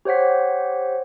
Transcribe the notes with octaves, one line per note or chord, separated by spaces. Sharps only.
G4 C5 C#5 F#5 B6